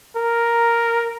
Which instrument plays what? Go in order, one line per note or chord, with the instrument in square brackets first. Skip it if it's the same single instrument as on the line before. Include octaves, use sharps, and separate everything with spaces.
[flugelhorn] A#4